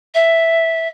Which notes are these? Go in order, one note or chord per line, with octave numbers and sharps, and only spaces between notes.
E5